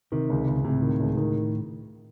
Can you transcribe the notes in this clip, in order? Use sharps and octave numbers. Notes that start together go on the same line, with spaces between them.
C3 D#3
C#2
C#2
A2 C3
D#3
C#2
D#3